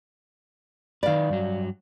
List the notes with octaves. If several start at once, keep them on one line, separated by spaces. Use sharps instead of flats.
D#3 B4 D5 F5
G2 F#3